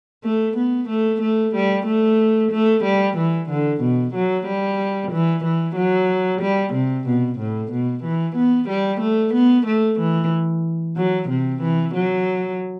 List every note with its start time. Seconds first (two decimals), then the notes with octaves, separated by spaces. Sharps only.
0.24 A3
0.57 B3
0.89 A3
1.21 A3
1.55 G3
1.86 A3
2.52 A3
2.84 G3
3.17 E3
3.50 D3
3.81 B2
4.14 F#3
4.46 G3
5.12 E3
5.44 E3
5.76 F#3
6.41 G3
6.73 C3
7.07 B2
7.39 A2
7.72 B2
8.04 E3
8.36 B3
8.69 G3
9.01 A3
9.34 B3
9.66 A3
9.99 E3
10.96 F#3
11.29 C3
11.62 E3
11.94 F#3